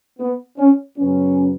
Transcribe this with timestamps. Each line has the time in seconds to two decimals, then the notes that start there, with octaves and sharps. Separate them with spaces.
0.18 B3
0.58 C#4
0.97 F#2 C#3 F#3 B3 C#4